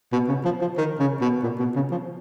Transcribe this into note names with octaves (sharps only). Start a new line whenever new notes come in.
B2
C#3
F3
F3
D#3
C#3
B2
A#2
B2
C#3
F3